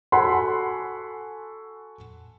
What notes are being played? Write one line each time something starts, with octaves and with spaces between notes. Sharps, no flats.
F#4 A4 F#5 G#5 B5 C6